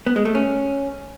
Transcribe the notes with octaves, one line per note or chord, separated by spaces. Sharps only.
B3
G#3
A3
C#4